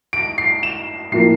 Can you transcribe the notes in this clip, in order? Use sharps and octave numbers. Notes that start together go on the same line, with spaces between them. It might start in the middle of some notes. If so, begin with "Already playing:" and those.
D7
C7
E7
A2 F3 A#3 C7